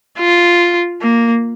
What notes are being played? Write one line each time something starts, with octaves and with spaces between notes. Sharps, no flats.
F4
A#3